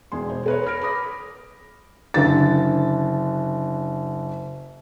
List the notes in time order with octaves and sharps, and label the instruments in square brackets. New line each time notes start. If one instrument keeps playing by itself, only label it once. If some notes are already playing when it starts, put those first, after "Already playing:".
[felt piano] E1 E2 G#4 C6
B2 C5
A#4 B4 C#5
B5 F6 A#6 D7
B5 D6 D#6 A#6
F#1 D3 A6